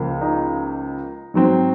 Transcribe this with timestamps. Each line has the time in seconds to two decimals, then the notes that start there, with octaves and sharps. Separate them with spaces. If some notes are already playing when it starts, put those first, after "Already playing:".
Already playing: C#2 C#3 F3 A#3
0.21 D#4
1.34 G#2 F#3 C4